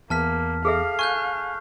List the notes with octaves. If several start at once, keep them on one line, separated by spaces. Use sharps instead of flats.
E2 A#3 A5 F6 B6
G#4 A4 E5 F5
G#5 C#6 F#6 G6